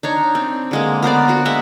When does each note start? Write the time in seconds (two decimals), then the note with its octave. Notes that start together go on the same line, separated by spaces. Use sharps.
0.03 D4 D#4 C#5
0.35 C4
0.71 D3 G#3 A#3
1.03 B3 A#4 C5 D5
1.28 D4 F#4
1.45 G#3 A#3 E5 F#5